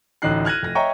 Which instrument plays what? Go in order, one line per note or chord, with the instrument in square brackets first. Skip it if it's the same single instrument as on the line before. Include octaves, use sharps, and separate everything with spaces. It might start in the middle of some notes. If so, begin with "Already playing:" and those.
[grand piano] A1 D2 D#4 F#6 C7
F6 F#6 G#6 A#6 D#7
F1 A#6
C#5 D#5 E5 G5 A#5 C#6